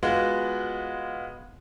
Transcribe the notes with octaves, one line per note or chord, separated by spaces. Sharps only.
G#3 B3 F4 F#4